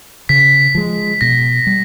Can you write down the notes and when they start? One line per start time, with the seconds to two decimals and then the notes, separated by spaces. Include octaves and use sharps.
0.29 C#3 B6
0.75 F3 G#3
1.21 B2 A#6
1.67 G3